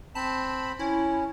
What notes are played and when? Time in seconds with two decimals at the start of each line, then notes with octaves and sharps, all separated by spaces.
0.15 C4 A5 B5
0.79 C#4 E4